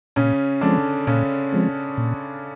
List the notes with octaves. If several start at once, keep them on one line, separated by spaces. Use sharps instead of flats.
A#2 C#3 C#4
D3 F3 G#3 C4 D4
A#2 C#3 C#4
F3 G#3 C4
A#2